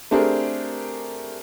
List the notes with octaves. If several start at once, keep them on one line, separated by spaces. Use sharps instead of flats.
A3 C4 D4 G4 G#4 A#4